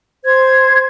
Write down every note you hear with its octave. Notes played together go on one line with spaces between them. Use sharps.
C5 G#6